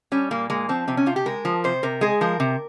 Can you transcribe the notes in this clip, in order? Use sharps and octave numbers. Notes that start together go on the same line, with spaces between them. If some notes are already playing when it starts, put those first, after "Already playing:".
G3 C#4
A#2 A#3
G#3 A#3
F3 C4
C3 C4
C#4
C3 F4
G4
G#3 A#4
F3
C3 C5
C3 A#4
G#3 G#4
F3 A#4
C3